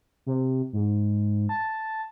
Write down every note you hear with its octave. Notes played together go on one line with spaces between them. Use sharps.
C3
G#2
A5